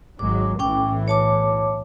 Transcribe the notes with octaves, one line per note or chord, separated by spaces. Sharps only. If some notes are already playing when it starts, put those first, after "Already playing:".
G#1 F#3 G#3 D6
B1 A2 E3 C#4 G5 D6
C#5 A5 D6